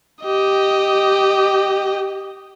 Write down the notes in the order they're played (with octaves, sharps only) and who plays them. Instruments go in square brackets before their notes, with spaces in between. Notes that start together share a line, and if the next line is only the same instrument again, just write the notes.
[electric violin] G4 D#5